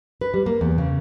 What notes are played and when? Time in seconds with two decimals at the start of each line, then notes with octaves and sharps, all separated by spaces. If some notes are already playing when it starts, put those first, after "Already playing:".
0.21 B4
0.34 G3
0.46 A#3
0.61 E2
0.78 C#3